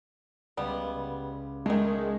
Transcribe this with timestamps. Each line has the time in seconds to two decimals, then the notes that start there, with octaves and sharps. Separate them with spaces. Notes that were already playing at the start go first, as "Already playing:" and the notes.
0.57 C#2 G3 B3
1.66 D#3 G#3 A3